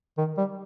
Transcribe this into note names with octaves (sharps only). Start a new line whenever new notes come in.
D#3
G3